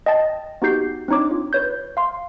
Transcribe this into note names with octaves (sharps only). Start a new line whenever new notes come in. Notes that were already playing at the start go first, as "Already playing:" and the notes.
D#5 G5 A5 A6
B3 D#4 F#4 G4 G6 C7
C4 D4 D#4 C#5 D6
F4
B4 C#5 G6
F5 C6